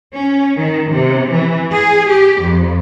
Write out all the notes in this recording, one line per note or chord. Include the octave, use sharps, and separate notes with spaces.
C#4
D#3
C3
E3
G#4
G4
F2